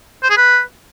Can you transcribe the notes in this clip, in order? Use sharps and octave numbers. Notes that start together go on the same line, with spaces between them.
C5
G#4
B4